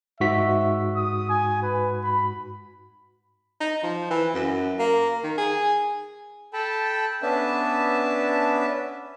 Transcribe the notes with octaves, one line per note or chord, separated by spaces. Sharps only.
G#2 F#4 E5 B6
D#6
G#5
B4
B5
D#4
F3
E3
F#2
A#3
D#3
G#4
A4 G5 A5 B5
B3 C#4 D4 B4 E5 A5